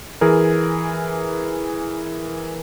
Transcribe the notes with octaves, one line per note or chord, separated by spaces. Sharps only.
E3 G#4 A#4